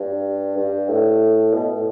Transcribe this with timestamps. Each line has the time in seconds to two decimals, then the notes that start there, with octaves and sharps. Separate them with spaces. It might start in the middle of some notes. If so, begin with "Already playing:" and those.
Already playing: G2
0.56 G2
0.89 A2
1.53 B2
1.74 A2